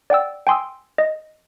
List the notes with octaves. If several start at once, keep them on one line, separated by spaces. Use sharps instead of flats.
D5 F#5 G5 E6
G5 G#5 C6 D#6 E6
D#5